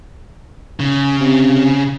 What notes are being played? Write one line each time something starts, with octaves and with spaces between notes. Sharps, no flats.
C#3
C3